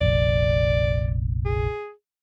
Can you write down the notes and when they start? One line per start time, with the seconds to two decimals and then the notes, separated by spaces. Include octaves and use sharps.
0.01 F1 A#1 D5
1.45 G#4